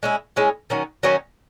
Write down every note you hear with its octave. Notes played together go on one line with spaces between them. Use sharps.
G#3 C#4 E4
G#3 C#4 E4
D#3 F#3 C#4
D#3 F#3 C#4